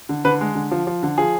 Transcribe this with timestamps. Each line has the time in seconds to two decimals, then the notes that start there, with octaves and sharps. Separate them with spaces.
0.09 D3
0.25 D3 B4
0.41 G#3
0.55 D3
0.71 F3
0.87 F3
1.03 D3
1.18 F3 G#4